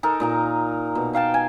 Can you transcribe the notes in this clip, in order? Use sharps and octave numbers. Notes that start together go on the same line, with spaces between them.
D#4 A4 A#4
A#2 D#4 A#5
B2
D#4 F5 G5 A5
G#5